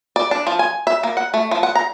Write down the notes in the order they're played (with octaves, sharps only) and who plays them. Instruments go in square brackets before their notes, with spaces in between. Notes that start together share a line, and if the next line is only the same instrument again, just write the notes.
[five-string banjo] D5
D4
F3
G#5
E5
A#3
F#5
A3
F3
F#5
A#5